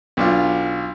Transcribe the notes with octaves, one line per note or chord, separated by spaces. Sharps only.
B1 D4 F4